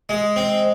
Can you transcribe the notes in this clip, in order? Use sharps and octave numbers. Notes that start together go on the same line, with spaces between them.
G#3
C4